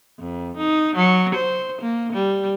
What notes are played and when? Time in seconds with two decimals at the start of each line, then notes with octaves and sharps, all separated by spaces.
0.19 F2
0.57 D#4
0.96 F#3
1.35 C5
1.82 A#3
2.13 G3